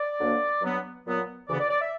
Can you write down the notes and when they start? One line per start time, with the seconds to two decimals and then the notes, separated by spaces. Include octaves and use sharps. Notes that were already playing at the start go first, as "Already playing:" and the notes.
Already playing: D5
0.18 D2 D3 F#3 A#3
0.62 G2 F#3 B3
1.05 A#2 F#3 B3
1.48 D2 C#3 E3 B3 D5
1.59 D5
1.69 D5
1.80 E5